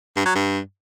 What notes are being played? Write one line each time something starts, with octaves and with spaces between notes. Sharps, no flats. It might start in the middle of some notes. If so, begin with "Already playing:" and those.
G2
F#3
G2